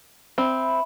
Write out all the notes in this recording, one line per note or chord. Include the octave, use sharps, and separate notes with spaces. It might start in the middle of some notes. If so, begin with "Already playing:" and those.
C4 E5 B5